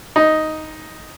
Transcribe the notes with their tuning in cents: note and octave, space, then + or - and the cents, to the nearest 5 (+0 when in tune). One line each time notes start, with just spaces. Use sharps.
D#4 +5